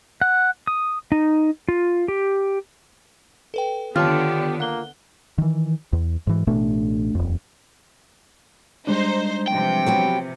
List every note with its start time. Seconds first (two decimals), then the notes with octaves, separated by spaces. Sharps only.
0.21 F#5
0.67 D#6
1.12 D#4
1.69 F4
2.08 G4
3.54 A4 B4 G5
3.96 D3 D#3 B3 F4 G4 C#5 A5
4.60 A#3 F#5 F#6 G7
5.38 D#3 E3
5.93 E2
6.27 G#2 E3
6.47 A1 B2 A3 D4
7.15 D#1 F2
8.87 G3 G#3 D4 D#4 C5
9.48 C3 E3 F3 G5
9.87 F#3 B3 G4